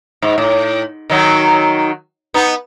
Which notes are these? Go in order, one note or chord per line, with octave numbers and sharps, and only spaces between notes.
G#2
A2
D#3 F#3 D#4
B3 D#4